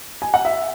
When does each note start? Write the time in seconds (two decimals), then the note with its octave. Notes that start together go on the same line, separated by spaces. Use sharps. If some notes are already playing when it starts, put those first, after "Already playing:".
0.22 G#5
0.34 F#5
0.45 E5